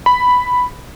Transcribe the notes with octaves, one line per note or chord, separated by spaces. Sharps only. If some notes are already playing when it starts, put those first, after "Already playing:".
B5